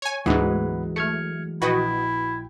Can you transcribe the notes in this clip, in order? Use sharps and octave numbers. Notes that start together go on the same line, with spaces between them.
C#5 G#5
D2 G#2 E3 F#3 G#3 B3 B4
A3 F6 G#6 C#7
A#1 E4 F#4 B4 D#5 G5